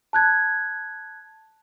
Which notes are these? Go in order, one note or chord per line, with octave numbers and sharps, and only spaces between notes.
A5 F#6 G#6